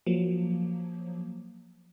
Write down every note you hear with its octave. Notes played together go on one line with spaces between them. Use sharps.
F3 F#3 A#3